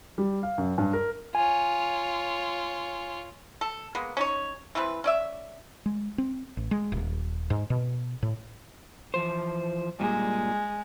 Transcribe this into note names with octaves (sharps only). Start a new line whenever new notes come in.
G3
F5
F#2
G2
A#4
F4 C#5 G#5
A4
G#3 A#3 B3
C#4 D#4 C#5
E3 G3 C4 B4
C#4 D5 E5
G#3
C4
A1
G#3
D#1
G#2
B2
A2
E3 F3 C5
G2 A#2 G3 G#3